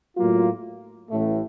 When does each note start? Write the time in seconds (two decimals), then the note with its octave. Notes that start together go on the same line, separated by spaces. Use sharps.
0.17 A2 F#3 A#3 F4
1.10 A1 A2 A3